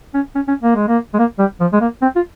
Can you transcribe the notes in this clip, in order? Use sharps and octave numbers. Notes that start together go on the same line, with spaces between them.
C#4
C#4
C#4
A#3
G#3
A#3
G#3
A#3
G3
F3
G#3
A#3
C4
F4